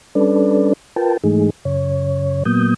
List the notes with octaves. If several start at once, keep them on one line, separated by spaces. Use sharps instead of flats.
G3 C#4 D4 A4 B4 D5
F4 A#4 B4 G5 A5
G#2 E3 G#3 A3 D#4 G#4
F#2 C#3 C#5
A#2 F#3 A#3 B3 D#6 G6